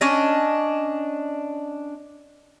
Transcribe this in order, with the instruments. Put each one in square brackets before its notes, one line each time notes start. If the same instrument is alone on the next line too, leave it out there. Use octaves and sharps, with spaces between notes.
[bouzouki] C#4 D4 D#5